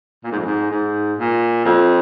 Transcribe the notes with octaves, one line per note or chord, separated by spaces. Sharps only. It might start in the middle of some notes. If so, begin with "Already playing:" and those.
A#2
G#2
F2
G#2
G#2
A#2
F2